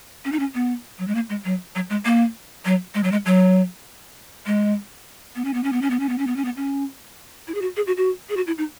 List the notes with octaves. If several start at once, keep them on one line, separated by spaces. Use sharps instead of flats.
C#4
D#4
C#4
B3
F#3
G#3
A#3
G#3
F#3
F#3
G#3
A#3
F#3
G#3
F#3
G#3
F#3
G#3
B3
C#4
B3
C#4
B3
C#4
B3
C#4
B3
C#4
B3
C#4
B3
C#4
E4
G#4
F#4
G#4
F#4
F#4
G#4
F#4
E4
D#4